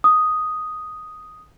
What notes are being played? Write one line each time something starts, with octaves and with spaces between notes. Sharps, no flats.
D#6